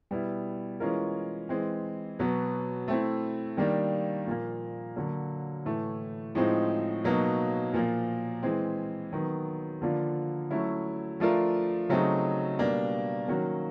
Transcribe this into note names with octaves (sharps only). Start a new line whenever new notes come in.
B2 G3 B3 E4
E3 G#3 C#4 F4 A#4
E3 G#3 C4
B2 F#3 B3
A3 C4 E4
D#3 G3 A#3 D4
A#2 F3 A#3
D3 F#3 A#3
A2 E3 A3
A2 F3 G#3 C4 D#4
B2 F#3 A#3 D#4
A#2 F3 A#3
E3 G#3 C4
D#3 F#3 B3
D3 F3 A#3 D4 F4
F#3 A3 C#4 E4
F3 A3 D4 F4 A#4
C#3 F#3 A3 C4 D#4
B2 G3 A#3 D4
D#3 F#3 A#3 C#4 F#4